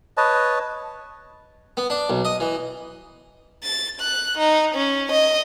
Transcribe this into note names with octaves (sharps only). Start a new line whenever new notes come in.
B4 C#5 D#5 A5
B3
D4
B1
D#5
E3
A6
F#6
D#4
C#4
D#5